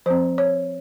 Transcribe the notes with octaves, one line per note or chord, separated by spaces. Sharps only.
F3 C4 C5
C#5